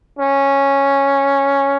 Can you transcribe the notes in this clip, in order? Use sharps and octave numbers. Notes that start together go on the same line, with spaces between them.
C#4